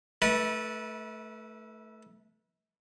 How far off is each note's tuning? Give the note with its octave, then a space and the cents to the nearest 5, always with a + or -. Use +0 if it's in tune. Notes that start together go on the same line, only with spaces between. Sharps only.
A3 +0 E4 -40 B4 -25